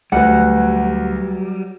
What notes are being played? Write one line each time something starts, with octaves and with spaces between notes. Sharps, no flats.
D2 F#3 G3 B4 F#5